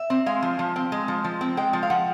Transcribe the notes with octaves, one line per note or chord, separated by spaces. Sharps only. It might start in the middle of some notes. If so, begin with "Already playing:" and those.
Already playing: E5
C4
G#3 F5
F3
F3
C4
G#3
F3
F3
C4
G#3 G5
F3
F5
F3 F#5